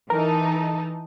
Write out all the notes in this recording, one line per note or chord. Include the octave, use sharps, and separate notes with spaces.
E3 D#4 A4 A#4